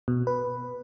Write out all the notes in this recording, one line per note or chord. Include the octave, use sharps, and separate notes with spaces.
B2
B4